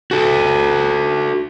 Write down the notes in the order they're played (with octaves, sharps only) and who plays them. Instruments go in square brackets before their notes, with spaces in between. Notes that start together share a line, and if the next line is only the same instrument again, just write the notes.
[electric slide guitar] F#4 A4